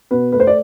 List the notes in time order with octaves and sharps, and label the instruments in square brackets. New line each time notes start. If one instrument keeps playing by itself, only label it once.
[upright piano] B2 B4
A3 B4
C5
D5